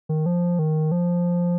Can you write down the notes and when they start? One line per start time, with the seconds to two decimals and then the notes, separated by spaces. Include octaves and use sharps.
0.09 D#3
0.26 F3
0.59 D#3
0.92 F3